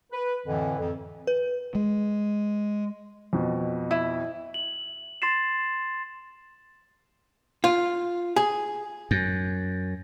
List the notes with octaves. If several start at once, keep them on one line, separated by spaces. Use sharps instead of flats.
B4
F2 A2 D3 E3
F2
B4
G#3
F2 B2
E4
F#7
C6 A6 C7 E7
F4
G#4
F#2